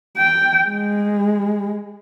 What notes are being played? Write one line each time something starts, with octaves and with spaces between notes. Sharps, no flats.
G5
G#3